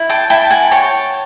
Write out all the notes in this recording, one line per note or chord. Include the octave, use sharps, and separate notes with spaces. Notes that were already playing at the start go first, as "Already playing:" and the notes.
Already playing: E4
G5 A5
E4 G5 A5
F#5 G#5
C#5 G5 A5